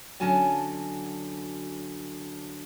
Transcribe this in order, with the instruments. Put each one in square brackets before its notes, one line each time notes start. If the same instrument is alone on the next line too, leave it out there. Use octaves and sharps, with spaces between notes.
[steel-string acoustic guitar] D3 F#3 C#4 F#4 G#5 A5